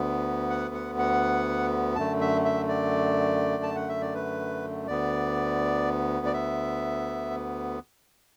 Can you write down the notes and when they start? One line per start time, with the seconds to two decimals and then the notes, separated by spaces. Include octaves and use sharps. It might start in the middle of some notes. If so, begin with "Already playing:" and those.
Already playing: D2 D3 B3
0.50 F#5
0.74 F#5
0.99 F#5
1.96 F#2 D3 A3 A5
2.21 E5
2.45 E5
2.68 D5
3.63 A5
3.75 F#5
3.89 E5
4.01 D5
4.15 B4
4.87 D2 D3 B3 D5
6.26 D5
6.34 E5